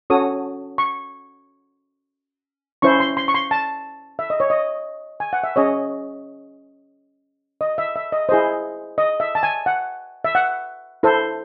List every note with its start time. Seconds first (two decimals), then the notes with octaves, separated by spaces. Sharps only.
0.10 C#4 F#4 A4 C#5 D#6
0.78 C#6
2.82 C#4 E4 C5 C#6
3.00 C6
3.17 C6
3.28 C#6
3.34 C6
3.51 A5
4.19 E5
4.30 D#5
4.40 C#5
4.50 D#5
5.20 G#5
5.33 F#5
5.44 E5
5.56 C#4 G#4 C#5 D#5
7.61 D#5
7.78 E5
7.96 E5
8.12 D#5
8.29 E4 G#4 C5 D#5
8.98 D#5
9.20 E5
9.35 A5
9.43 G#5
9.66 F#5
10.24 E5
10.35 F#5
11.03 E4 A4 C5